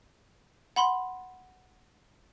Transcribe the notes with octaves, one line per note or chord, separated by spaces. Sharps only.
F#5 B5 C6